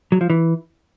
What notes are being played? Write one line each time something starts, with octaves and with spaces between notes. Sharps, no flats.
F#3
F3
E3